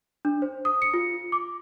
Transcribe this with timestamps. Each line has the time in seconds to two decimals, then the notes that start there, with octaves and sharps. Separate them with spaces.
0.25 D4
0.42 C5
0.65 D#6
0.82 C#7
0.94 F4
1.32 D6